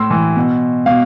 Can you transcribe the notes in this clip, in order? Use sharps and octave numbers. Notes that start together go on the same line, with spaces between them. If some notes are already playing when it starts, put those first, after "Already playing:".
Already playing: A2 C6 E6
E3
B2
B2 F5